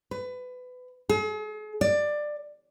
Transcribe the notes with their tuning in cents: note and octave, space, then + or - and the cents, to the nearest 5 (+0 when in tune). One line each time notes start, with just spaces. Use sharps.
B4 +25
G#4 +45
D5 +15